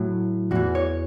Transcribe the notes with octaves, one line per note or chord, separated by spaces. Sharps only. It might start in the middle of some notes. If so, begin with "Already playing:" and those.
Already playing: A2 F#3 E4
E2 E3 F#4
C#5